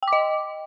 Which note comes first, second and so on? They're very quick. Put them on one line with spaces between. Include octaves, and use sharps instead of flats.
G5 D6 D#5